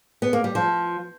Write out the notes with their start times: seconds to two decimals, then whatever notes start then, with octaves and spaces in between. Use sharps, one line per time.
0.22 B3
0.33 A#3
0.44 G3
0.55 F3